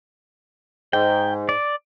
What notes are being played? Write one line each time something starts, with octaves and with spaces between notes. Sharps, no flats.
G#2 G5
D5